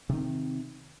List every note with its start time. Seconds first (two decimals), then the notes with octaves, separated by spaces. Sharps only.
0.10 C3
0.13 D#3
0.17 C4